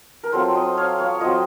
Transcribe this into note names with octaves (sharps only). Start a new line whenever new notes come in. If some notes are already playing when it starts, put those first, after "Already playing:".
A#4
F#3 C4 F4 A4 C5
C5 D#5
C#5 F5
C#5 F5
F#3 C4 F4 C5 D#5